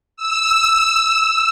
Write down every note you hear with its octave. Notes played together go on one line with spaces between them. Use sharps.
E6